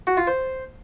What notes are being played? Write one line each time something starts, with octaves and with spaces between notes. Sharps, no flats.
F#4
F4
C5